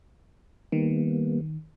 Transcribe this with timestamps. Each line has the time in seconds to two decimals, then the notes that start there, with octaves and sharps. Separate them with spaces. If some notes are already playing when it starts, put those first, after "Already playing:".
0.72 D#3 G3 A#3 B3